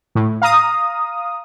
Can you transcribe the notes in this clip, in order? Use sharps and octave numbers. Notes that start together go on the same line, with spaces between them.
A2
F5 A#5 D#6